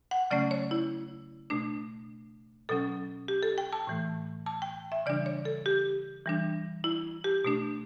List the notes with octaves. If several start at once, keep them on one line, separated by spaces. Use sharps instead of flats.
F#5
C#3 F#3 A3 C#4 D5
C#5
E4
B2 A3 D4
B2 F#3 C#4 A4
G4
A4
G5
A5
A2 E3 A3
A5
G5
E5
C#3 E3 G3 D4 D5
C#5
A4
G4
E3 G3 D4
E4
G4
B2 A3 D4